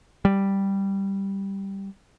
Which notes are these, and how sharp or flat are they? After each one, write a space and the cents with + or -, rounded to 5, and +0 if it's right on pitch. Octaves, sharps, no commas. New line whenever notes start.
G3 +0